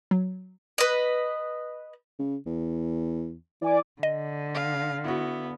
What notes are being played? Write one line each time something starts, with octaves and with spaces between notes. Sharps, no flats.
F#3
B4 D#5
C#3
E2
E3 D5 G#5 D6
D3 D#5
F5
B3 E4 F#4